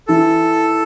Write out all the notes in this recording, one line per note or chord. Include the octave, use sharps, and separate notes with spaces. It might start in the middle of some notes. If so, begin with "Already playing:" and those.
E3 A4